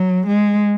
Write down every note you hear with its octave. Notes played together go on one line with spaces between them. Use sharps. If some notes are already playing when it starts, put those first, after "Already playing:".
Already playing: F#3
G#3